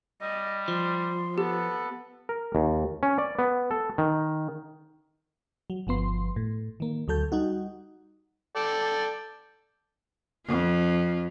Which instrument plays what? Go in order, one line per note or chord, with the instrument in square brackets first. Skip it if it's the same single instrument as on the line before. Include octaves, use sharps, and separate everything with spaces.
[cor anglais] G3 [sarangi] D#5
[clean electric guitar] F3 [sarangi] C6
[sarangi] B3 [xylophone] G4 [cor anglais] A4
[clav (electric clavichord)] A#4
D#2
C#4
D5
B3
A4
D#3
[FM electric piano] F#3
G1 F3 B3 C6
A2
D#3 A#3
D2 F#3 A4 G6
G3 D#4 F#4
[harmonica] A4 D5 G5
[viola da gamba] F2 F4